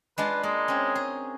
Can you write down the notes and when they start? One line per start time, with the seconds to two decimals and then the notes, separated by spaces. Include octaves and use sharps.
0.18 G#3 D4 F4 B4
0.43 G#3 A#3
0.68 C4 C#4
0.95 G#4